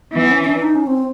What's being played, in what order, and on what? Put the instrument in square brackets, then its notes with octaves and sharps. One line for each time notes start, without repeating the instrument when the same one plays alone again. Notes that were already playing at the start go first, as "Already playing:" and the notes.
[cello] E3 [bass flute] B3
[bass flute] C#4
C#4
D4
D#4
C#4
C4